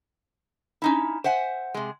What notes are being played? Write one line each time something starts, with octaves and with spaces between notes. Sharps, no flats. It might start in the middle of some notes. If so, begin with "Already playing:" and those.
C#4 D#4 E4
C5 E5 F#5 G#5
C3 G#3